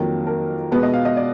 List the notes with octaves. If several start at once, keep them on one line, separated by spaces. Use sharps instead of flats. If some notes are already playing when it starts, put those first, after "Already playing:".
Already playing: F2 D#3 F#3 A#3
A#4
B2 G#3 B3 B4
D#5
F5
D#5
D5